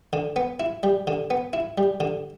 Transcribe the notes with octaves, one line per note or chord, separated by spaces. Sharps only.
D3
B3
E4
G3
D3
B3
E4
G3
D3